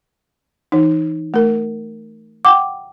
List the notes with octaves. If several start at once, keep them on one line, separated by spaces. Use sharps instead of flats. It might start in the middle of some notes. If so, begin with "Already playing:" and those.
E3 D#4
A3 A#4
F#5 G5 D6